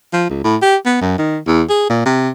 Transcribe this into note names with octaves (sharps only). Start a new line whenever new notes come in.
F3
C#2
A2
G4
B3
F#2
D#3
E2
G#4
A#2
C3